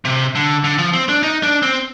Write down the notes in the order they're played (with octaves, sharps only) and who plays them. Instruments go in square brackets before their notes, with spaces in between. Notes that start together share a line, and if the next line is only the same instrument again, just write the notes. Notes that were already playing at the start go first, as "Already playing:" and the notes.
[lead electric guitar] C3
D3
D3
F3
C4
D4
D#4
D4
C4